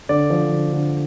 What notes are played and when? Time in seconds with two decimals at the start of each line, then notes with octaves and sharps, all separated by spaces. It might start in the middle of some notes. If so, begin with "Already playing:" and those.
0.09 D3 D5
0.30 F3
0.52 D3
0.73 D3